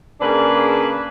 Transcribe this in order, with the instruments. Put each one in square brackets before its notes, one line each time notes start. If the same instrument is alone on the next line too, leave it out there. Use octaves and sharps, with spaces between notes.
[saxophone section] C#3 A#3 D4 G#4 B4